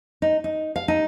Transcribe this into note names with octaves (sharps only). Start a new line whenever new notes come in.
D#4
D#4
F5
D#4